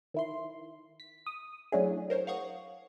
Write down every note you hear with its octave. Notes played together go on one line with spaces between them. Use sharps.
D#3 E4 C6
B6
D#6
F#3 A3 C#4 D4 E4 G#4
A#4 C5 C#5
F5 F#5 C#6 D#6